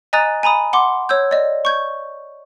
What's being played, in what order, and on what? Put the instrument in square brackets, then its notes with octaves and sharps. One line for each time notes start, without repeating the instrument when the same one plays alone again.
[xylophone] D#5 G#5 A#5 D#6 F#6 A6
G#5 A#5 B5 D#6
F#5 C6 D6
C#5 E6 G6
D5 D#5
C#6 G6 G#6